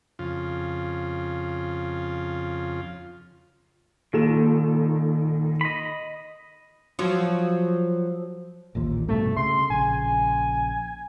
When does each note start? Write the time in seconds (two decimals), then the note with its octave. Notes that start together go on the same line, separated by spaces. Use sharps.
0.19 F2 C#3 F4
4.13 A#1 D#3 A4 E7
5.61 D#5 B5
6.99 F3 F#3
8.75 A1 D#2 A#2
9.08 C2 G2 B2 A3
9.37 C#3 C6
9.70 A#1 C#3 G#5